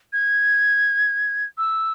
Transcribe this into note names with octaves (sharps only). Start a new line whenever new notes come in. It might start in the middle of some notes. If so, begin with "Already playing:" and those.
G#6
E6